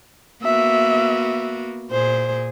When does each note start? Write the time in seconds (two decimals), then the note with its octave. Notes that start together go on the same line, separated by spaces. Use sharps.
0.43 A#3 B3 F#4 E5
1.91 A#2 G#4 C5